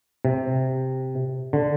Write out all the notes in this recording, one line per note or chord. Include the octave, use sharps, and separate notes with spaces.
C3
D3